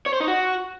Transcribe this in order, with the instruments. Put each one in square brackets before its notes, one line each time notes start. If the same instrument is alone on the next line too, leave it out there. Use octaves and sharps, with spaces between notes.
[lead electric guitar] C#5
C5
D#4
F#4